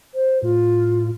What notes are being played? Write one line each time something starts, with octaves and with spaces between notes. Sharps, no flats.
C5
A2 F4